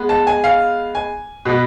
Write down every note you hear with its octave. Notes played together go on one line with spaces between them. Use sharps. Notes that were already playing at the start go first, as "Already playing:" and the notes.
Already playing: G#3 B3
A5
G#5
F5
G#5
B2 B3